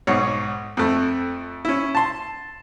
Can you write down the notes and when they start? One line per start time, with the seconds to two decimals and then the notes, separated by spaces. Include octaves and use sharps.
0.07 B1 G#2 C#5
0.77 F2 A3
1.65 C#4 E4
1.95 A5 C6